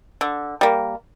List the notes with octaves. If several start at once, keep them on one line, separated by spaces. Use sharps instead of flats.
D3
G3 A#3